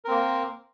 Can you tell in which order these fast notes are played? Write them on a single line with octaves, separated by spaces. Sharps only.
A#4 C4 A#3